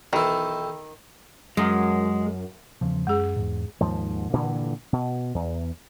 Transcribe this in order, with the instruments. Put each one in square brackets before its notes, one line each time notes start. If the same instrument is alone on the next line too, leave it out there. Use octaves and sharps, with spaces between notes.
[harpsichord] B1 E3 [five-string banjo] D#3 [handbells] G5 B5 E6
[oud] F#2 [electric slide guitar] G#3
[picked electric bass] E2 C#3 F3
[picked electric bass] F#2 [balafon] G#3 G#4
[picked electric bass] E2 G#2
[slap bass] D#2 G#2 F3
G2 A#2 D3 E3
B2
E2